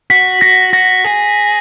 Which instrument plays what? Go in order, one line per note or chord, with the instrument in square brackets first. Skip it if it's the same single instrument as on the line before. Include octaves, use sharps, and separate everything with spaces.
[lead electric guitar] F#4 [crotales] B6
[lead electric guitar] F#4 [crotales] A#6
[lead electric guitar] F#4 [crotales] A#6
[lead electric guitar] G#4